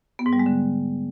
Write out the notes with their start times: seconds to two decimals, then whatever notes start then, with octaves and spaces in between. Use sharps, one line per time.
0.19 B3
0.26 G#2
0.33 G3
0.39 G#3
0.46 D3